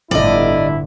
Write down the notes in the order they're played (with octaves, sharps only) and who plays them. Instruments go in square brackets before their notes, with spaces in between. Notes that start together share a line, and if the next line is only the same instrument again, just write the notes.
[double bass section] G1 A2 D3 [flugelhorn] E4 [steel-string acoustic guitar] D5 D#5